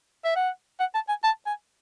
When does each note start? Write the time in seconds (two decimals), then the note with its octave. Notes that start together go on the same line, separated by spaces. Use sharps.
0.25 E5
0.36 F#5
0.80 F#5
0.95 A5
1.09 G#5
1.24 A5
1.46 G#5